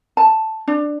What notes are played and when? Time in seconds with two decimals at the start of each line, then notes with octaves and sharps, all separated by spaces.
0.17 A5
0.68 D4